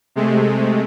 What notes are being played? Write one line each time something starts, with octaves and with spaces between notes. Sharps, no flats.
C3 G#3 A3